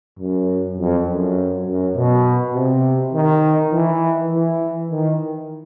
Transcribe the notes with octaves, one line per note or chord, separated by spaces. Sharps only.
F#2
F2
F#2
F#2
B2
C3
D#3
E3
E3
D#3